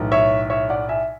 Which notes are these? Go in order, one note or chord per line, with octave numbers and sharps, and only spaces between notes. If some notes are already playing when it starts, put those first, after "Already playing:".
Already playing: B1 A2 E3
C#5 E5
C#5 E5
D5 F#5
E5 G#5